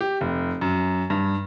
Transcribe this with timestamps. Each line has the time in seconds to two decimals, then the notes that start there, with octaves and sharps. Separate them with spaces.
0.01 G4
0.21 F1
0.61 F#2
1.10 G2